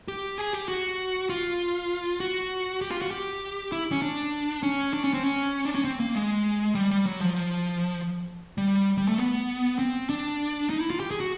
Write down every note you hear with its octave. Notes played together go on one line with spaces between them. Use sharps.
G4
G#4
G4
F#4
F4
F#4
G4
F4
F#4
G4
E4
C#4
D4
C#4
D4
C#4
C4
C#4
D4
C#4
C4
A#3
G#3
G3
G3
F#3
F3
F3
G3
G3
A3
B3
C4
D4
D#4
E4
F4
G4
G#4
F#4